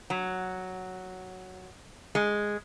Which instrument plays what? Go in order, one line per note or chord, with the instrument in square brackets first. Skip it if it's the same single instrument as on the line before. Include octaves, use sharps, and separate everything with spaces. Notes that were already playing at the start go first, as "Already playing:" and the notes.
[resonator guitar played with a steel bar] F#3
G#3